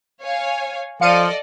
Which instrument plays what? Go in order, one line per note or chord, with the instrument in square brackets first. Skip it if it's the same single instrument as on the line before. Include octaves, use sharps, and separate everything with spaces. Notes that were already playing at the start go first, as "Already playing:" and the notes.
[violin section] C#5 F5 G#5
[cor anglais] F3 [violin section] A4 D5 D#5 [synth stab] F5 C#7 D#7